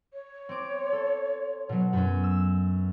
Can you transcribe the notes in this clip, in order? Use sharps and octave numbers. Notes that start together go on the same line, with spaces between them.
C#5
C4 D6
A4
B2 F#3
F#2 C#4
E6